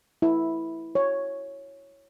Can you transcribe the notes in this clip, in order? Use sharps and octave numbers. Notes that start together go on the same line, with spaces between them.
E4
C#5